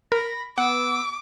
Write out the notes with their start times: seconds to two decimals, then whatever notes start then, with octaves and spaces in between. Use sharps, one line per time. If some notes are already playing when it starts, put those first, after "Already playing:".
0.12 A#4 B5 A#6
0.58 B3 F#5 D6 E6